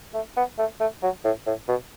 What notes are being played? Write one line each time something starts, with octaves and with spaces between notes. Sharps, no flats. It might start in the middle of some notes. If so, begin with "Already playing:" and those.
A3
B3
A3
A3
F#3
A2
A2
B2